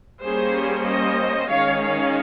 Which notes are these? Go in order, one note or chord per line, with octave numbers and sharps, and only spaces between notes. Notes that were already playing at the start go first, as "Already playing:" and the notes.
G3 A#3 C#4 G#4 C5
C5 D#5
D#3 G#3 C#4 C#5 F5
C#5 F5